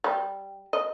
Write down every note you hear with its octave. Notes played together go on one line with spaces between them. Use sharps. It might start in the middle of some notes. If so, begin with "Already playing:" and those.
G3
D#5